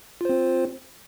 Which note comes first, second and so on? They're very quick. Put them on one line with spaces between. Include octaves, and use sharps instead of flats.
F4 C5 C4